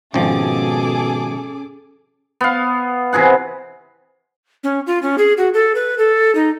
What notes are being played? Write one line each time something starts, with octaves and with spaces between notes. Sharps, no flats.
G#1 B2 F3 C#4 G#4 A4 D6
B3 F5
C3 E3 G#4 F#5
C#4
F4
C#4
G#4
F#4
A4
B4
A4
D#4